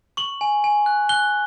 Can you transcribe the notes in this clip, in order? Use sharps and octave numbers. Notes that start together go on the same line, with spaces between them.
C#6 F#7
G#5
G#5
F#6
F#6 G7